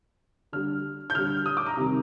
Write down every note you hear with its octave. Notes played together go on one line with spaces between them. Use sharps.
D3 G3 F6
G6
D3 G3 F6
D#6
D6
A#5
C3 D#3 G3 A#5